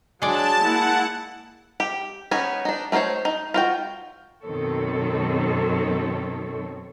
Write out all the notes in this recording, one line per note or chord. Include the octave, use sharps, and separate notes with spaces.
F#3 G#3 D4 D5 A5
A#3 E4 F#5
G4
B3 C#4 D#4 G#5
D4 D#4
A3 D#4 A#4 C5 C#5
D#4
F4 F#4 G5
F#2 B2 D#3 C4 A4 C#5